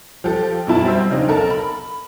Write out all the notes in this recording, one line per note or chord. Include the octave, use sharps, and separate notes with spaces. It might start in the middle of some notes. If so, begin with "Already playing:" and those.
F3 G4 A4
F#2 B2 E4 A5
G3 C4 C5 E5
C#3 F3 C4 D4 D#4
B1 A4 A#4 A5
B5